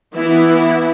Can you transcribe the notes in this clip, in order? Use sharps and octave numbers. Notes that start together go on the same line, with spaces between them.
E3 B3 E4